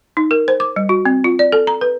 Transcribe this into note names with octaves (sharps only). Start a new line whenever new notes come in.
D#4
A#4
C5
D6
G3
F#4
C4
F4
D5
A4
A#5
B4